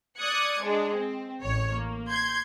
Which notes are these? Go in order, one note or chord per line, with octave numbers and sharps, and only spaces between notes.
D5 D#6 F#6 G#6 C#7
G#3 D4 G#4
C4
A1 C#5
A#3
C6 G6 G#6